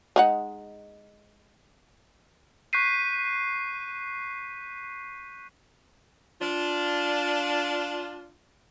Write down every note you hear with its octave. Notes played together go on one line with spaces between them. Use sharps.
G#3 D#4 F#5
C#6 F#6 G6 B6 C7 D#7
D4 F4